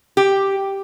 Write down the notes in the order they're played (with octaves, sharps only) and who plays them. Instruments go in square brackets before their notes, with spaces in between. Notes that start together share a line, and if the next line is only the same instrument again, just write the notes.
[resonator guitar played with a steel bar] G4